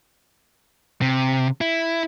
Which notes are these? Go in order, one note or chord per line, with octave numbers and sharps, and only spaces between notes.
C3
E4